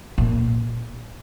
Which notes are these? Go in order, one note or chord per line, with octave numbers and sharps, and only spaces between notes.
A#2